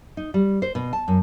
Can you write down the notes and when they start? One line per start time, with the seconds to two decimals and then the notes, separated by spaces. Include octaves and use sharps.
0.17 D#4
0.34 G3
0.62 C5
0.75 B2
0.93 A5
1.08 F#2